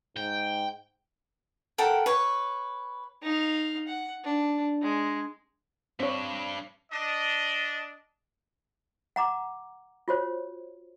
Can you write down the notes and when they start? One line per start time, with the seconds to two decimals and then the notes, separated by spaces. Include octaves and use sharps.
0.17 G#2 G5
1.78 A4 A#4 F#5 G5
2.06 B4 C#5
3.22 D#4 F5
3.87 F#5
4.24 D4
4.82 G#3
6.00 G2 C4 D4 C#5
6.92 D4 D#5
9.16 F#5 A#5 D6
10.08 F4 F#4 C5 C#5